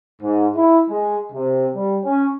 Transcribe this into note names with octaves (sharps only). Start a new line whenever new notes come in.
G#2
E4
G#3
C3
G3
C#4